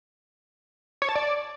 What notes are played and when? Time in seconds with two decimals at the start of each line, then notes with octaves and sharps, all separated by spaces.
1.02 C#5
1.09 A5
1.15 D5